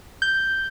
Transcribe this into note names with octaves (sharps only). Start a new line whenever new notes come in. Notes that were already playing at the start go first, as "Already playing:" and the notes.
G6